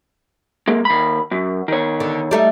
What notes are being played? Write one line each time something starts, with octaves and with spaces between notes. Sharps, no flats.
G#3 A#3
D#2 B5
F#2
D#3 C#5
D3
G3 A3 D#4